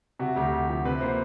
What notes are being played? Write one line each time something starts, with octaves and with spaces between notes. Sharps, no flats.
C3 F#4
D2 G4
D2
F3
C3 B4
A#3 C5